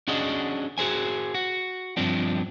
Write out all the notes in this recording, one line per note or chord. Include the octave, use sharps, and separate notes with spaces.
C#4 D4 F#4 G#4 D#5
F#4 G#4 C5 G#5
F#4
G2 F3 C4 D4